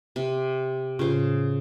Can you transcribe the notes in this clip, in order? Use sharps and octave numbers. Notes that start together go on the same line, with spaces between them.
C3
A2 C#3 F4 C5